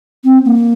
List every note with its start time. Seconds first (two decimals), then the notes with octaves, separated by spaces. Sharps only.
0.24 C4
0.45 A#3